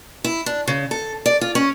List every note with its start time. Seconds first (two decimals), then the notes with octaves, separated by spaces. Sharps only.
0.24 E4
0.46 D4
0.68 C#3
0.91 A4
1.26 D5
1.41 F4
1.55 C#4